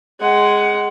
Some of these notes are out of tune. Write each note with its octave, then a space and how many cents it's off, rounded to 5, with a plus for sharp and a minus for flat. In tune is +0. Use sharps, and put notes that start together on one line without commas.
G#3 +0 F#5 +20